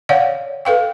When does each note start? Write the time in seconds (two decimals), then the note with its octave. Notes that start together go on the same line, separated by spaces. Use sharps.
0.09 C#5 D5 F5 F#5
0.65 A4 B4 F5 G5